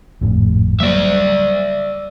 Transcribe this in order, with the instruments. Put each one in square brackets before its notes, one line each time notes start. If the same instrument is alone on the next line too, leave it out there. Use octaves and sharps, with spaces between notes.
[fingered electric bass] G#1 F2 A2
[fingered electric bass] F#3 G3 A#3 [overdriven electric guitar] D5 E5